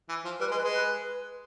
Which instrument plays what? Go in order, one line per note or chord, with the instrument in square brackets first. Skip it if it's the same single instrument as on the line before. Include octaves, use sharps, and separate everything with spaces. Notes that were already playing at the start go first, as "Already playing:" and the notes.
[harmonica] E3
F3
[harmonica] G3 [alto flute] B4
[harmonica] G#3
[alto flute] B4
[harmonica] G#3
[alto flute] B4